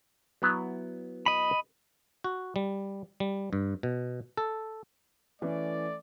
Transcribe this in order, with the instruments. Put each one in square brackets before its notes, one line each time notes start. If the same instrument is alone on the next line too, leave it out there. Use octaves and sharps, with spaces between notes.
[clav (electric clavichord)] F#3 B3 E4
[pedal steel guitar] D#5 B5
[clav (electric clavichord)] F#4
G3
G3
G2
B2
A4
[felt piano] E3 C#4 [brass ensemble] A3 D5